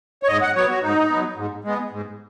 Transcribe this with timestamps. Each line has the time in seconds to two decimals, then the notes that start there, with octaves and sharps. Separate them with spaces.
0.23 C#5
0.28 G#2 D#5
0.42 F#5
0.55 F#3 B3 C#5
0.69 F#4
0.83 G#2 D#4
1.10 F#3 B3
1.37 G#2
1.64 G#3 B3
1.91 G#2